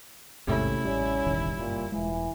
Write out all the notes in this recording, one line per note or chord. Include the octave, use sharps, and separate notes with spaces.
A1 D#2 G#2 C3 A3 C#4 E4
A1 G3 C#4
E1 A1 D#3
F#1 G2 A#2
E1 E3 G#3